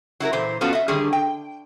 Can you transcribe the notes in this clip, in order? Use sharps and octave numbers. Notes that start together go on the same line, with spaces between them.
F#3 E4 A4 A#4
A#2 E3 C5
F3 B3 C#4 F4 F#4 A4
D#5 E5
D3 D#3 G3 G#4
G5